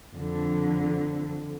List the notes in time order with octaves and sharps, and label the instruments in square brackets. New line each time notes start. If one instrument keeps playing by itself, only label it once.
[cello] F2 D3